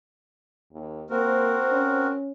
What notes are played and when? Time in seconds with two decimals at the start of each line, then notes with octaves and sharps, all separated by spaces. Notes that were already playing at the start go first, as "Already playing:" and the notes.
0.72 D#2
1.10 A#3 C4 F#4 A#4 C5
1.72 C#4